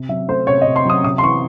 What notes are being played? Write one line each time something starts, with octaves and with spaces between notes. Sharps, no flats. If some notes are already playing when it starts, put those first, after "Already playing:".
Already playing: C3
F#3 E5
A3 C5
C3 C#5
D#5
C3
C6
F#3 D#6
C3 D#6
C6
E3 C#6